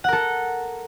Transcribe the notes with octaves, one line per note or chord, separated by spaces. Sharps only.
A4 A#4 F#5